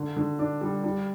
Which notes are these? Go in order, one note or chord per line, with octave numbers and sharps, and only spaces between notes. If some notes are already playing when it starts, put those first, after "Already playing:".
Already playing: D3
D3
D4
G3
G3